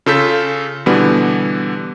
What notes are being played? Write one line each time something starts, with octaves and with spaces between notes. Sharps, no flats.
C#3 F4 A4 G6 B6
B2 D3 E3 G3 B3